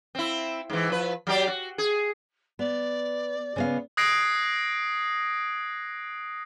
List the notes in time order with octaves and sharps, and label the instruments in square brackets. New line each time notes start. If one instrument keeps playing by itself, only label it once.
[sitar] C4 E4
G#2 E3
F3 B4
F#3 G4 D5
F#4
G#4
[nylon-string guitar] B3 [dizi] D5
[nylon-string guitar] C#3 B3 F5
[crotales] D#6 F#6 G#6 A#6 C7 D7